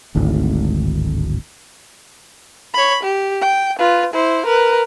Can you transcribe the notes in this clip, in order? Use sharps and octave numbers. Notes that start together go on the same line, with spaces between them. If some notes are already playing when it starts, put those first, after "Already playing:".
D1 G#1 D2 A2
C#5 B5
G4
G5
F4 B4
E4 C5
A#4 B4